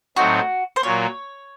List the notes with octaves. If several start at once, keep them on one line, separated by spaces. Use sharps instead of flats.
A2 F#3 C4 D#4 F#4
C5
A#2 F#3 A#3 C#5